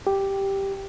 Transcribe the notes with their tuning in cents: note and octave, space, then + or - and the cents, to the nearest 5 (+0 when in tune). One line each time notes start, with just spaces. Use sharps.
G4 +0